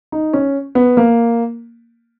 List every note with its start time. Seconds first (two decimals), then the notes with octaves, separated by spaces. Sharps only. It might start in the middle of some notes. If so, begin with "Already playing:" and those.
0.12 D#4
0.33 C#4
0.75 B3
0.97 A#3